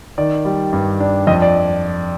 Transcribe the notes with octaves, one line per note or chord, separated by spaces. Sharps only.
D#3 D5
G3
G2
D4
F2 D#5
D5